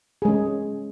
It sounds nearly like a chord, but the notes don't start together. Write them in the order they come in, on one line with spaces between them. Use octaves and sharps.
G#4 G#3 C#4